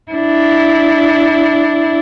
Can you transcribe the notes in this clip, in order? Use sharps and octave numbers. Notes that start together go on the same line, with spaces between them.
D4 E4